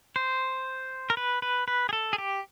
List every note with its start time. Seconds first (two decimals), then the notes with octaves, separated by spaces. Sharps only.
0.16 C5
1.10 A#4
1.17 B4
1.42 B4
1.68 B4
1.89 G#4
1.93 A4
2.13 G#4
2.18 G4